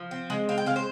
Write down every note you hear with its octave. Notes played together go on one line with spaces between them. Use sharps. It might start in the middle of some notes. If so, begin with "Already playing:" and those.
Already playing: F3
C4
G#3
C4 F5
G5
G#3 F5
C5